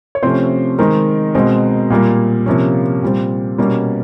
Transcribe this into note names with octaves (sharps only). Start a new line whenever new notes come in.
C#5
C3 F3 A3 C4 C#4 C5
D#3 G#3 C4 A#4
B2 G#3 C4
A#2 G3 A#3
C3 F3 A#3 C#4
A#2 G3 C4
B2 G3 A#3 C#4